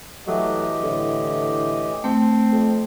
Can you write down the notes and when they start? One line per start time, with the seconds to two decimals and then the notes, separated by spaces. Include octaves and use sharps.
0.27 E3 F#3 A3 G4 D#5
0.83 A2 D3
2.04 A3 C4
2.52 F2